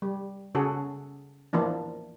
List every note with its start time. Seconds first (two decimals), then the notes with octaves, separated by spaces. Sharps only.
0.02 G3
0.55 C#3 F#4 G#4 A4
1.53 E3 F3 A#3 D4